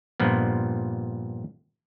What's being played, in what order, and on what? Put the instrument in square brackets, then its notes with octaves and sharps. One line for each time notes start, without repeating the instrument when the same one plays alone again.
[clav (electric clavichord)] G2 A#2 F3 B3